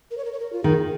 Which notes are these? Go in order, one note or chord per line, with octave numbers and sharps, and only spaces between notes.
A#4
C#5
A#4
C#5
A#4
F4
D#3 G#4